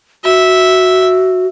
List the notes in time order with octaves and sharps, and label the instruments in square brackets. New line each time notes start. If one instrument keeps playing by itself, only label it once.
[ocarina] F#4 [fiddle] E5